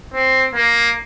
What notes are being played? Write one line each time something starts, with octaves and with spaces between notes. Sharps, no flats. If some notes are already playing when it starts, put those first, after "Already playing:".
C4
A#3